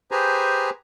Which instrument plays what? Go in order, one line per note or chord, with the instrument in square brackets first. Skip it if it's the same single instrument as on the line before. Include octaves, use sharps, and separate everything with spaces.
[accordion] G4 G#4 B4 C5 G#5 A#5